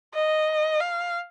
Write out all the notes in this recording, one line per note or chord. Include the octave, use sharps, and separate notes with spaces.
D#5
F5